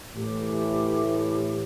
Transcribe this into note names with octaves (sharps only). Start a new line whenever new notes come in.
A2 E3 G4